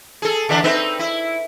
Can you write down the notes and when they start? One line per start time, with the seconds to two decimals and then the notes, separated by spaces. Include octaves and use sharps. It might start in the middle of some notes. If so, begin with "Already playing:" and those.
0.22 G#4 A4
0.49 D3 E3 D4
0.64 C4 D#4 B4
0.99 E4